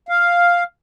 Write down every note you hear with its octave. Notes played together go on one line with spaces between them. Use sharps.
F5